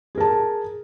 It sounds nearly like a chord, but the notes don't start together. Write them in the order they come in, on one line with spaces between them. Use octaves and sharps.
G#4 A#4 A5